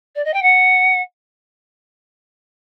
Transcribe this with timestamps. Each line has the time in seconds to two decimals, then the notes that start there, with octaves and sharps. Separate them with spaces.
0.15 D5
0.25 D#5
0.34 G5
0.42 F#5